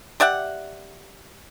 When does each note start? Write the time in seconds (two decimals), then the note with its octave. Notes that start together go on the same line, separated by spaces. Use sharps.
0.20 G4 D5 E5 F#5